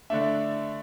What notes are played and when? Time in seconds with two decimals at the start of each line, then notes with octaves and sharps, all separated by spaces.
0.10 D3 A3 D4 E5
0.21 D5